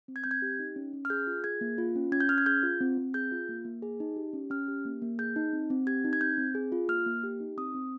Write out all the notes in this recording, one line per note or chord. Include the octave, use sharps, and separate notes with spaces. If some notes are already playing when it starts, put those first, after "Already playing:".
C4
G#6
C4 G6
G#6
G4
D#4
C#4
C#4
F6
G#4 G6
F4
G#4 G#6
A#3
F4
C#4
C#4 G#6
G6
C#4 F6
G#6
G#4 G6
F4
C4
C4
G#4 G6
F4
A#3
A#3
G#4
D#4
G4
C#4
C#4 F6
G4
A#3
A#3
G#4 G6
D#4
C4
C4
G4 G#6
D#4
G#6
C4 G6
C4
G#4
F4
A#3 F6
A#3
G4
D#4
C4 D#6
C4